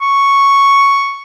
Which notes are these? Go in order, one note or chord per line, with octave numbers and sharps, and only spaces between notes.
C#6